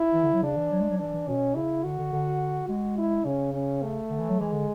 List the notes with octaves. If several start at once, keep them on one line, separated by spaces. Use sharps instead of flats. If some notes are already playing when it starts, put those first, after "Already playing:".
Already playing: E4
E3
D3
F#3
C#3 D4
E3
F#3
G#3
F#3
E3 D4
E3
B2 C#4
C#3 E4
D3 F#4
D3
D3
G#3 F#4
E4
C#3 C#4
C#4
A3
D3
E3
F#3
E3 G#3
D3